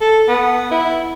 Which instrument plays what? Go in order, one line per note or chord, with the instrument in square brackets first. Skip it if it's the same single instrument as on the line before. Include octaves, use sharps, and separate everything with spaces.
[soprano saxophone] A4
B3
E4